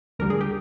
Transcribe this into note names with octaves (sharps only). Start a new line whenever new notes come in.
D2 D3 G3 A#4
G#4
G4